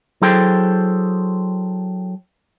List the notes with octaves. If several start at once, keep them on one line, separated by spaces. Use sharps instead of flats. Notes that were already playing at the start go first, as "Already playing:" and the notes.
F#3 E4 G#4 A4 C5 G5